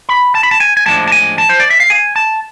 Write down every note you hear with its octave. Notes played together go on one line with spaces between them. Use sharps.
B5
A5
B5
A5
G#5
G#5
A2 F3 G#3 D4 A5
A5
G#5
A5
C5
D5
E5
F5
G#5
A5